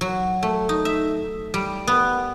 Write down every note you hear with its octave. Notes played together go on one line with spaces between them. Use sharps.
F#3
A3
D#4
E5
G3
B3